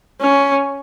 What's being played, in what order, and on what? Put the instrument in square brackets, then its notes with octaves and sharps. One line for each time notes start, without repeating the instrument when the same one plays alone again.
[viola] C#4